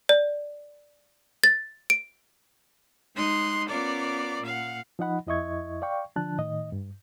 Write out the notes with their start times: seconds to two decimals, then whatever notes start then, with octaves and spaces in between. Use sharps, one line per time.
0.09 D5
1.44 A6
1.90 D7
3.14 G#3 D#4 C6 D#6 F#6
3.68 B3 C#4 F4 A#4 D5 D6
4.42 A#2 F5 F#5
4.99 F3 D#4 D#5 F#5 B5
5.27 F2 E4 D#5 E5 C#6 G#6
5.82 D5 F5 G5 C#6
6.16 D3 F3 D4 A5 F#6
6.38 A2 D#3 D#5
6.72 G2